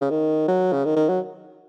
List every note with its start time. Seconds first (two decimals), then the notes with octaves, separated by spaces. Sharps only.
0.01 C#3
0.10 D#3
0.48 F#3
0.73 C#3
0.85 D#3
0.96 D#3
1.09 F#3